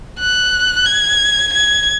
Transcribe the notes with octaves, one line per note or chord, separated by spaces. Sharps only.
F#6
G#6
G#6